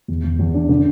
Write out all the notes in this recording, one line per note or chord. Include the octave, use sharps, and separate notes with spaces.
E2
E2
E2
D4
D3